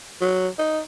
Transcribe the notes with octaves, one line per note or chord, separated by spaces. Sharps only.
F#3
D#4